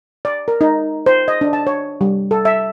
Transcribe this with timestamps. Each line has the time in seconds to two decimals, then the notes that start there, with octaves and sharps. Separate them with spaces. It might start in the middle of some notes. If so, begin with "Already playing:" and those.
0.25 D5
0.48 A#4
0.61 D#4
1.06 C5
1.28 D#5
1.41 D4
1.53 A5
1.67 C#5
2.01 G3
2.31 A4
2.45 E5